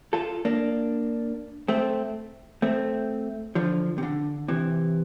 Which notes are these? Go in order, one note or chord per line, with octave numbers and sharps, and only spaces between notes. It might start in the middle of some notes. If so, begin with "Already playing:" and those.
F4 A4
A#3 D4
A3 C4
A3 C4
D3 F3
C3
D3
C3 E3